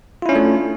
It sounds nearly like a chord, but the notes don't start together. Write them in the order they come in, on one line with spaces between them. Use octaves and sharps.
F4 E4 C#4 D4 A3